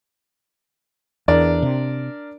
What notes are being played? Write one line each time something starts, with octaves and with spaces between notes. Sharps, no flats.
E2 D4 A#4 D5
C3